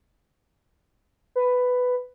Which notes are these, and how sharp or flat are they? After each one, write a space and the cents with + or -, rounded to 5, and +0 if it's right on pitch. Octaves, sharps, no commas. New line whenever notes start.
B4 +10